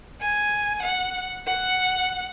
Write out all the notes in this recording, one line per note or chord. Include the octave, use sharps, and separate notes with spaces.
G#5
F#5
F#5